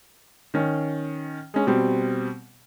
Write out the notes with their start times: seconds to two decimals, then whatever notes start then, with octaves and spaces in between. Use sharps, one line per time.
0.54 D#3 C#4
1.54 G#3 C#4
1.67 B2 G3 C4